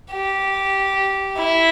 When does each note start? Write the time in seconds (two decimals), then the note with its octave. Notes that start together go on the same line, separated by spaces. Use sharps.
0.12 G4
1.38 E4